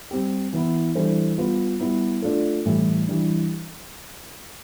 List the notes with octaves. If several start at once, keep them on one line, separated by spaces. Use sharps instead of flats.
G3 C4 G4
E3 B3 E4
E3 G3 D4 A4 C5
G3 B3 F4 B4
G3 B3 E4
A3 D4 F4 A4
A2 E3 G3
E3 G3 D4